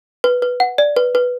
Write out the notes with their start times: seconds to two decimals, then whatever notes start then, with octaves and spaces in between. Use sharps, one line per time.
0.24 B4
0.42 B4
0.60 F#5
0.78 D5
0.96 B4
1.15 B4